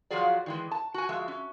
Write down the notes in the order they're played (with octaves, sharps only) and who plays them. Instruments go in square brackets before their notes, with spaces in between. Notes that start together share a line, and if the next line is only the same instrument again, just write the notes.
[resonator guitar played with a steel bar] F3 F#3 F4 F#4 G#4 D5
D#3 E3 G#3
A5
F#4 G#5
F3 G#3 E5
C#4